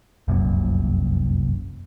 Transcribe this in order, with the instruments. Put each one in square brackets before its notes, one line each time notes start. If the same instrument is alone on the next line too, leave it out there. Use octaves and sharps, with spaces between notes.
[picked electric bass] F1 C2 F#2 A#2